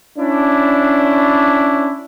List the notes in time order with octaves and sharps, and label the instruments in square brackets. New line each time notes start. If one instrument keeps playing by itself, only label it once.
[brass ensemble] C#4 D4 E4